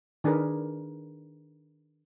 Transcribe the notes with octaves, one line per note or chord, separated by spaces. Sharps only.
D#3 D4 G#4 A#4 B4